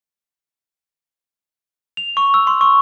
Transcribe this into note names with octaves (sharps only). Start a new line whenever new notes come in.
F7
C#6
E6
C6
C#6